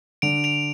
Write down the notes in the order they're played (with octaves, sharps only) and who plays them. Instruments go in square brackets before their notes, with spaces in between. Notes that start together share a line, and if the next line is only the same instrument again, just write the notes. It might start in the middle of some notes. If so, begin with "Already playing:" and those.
[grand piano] D3 [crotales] D7 F7
[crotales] D7 F7